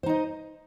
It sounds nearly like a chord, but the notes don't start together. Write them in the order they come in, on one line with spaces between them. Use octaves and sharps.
C5 D#4 D#5